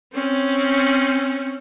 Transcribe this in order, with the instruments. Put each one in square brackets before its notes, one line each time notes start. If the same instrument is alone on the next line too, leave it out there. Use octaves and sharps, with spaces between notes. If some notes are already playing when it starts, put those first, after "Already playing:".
[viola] C4 C#4